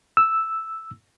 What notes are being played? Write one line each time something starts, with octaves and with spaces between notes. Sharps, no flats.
E6